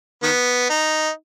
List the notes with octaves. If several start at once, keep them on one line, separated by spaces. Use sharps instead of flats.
D#3 B3
D#4